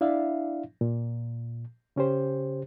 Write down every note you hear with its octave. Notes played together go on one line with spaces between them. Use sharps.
D4 E4 D5 E5 F5
A#2
C#3 C#4 G4 C5